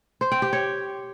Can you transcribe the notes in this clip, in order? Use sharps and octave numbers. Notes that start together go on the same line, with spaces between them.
C5
G5
G4
C#5